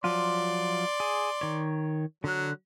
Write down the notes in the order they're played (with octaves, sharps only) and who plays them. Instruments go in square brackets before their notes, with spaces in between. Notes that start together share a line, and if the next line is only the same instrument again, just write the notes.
[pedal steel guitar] F3 F#3 F4 [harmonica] D5 C6
[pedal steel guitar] G#4
D#3 C#5
[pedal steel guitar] D3 F#6 [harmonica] F#3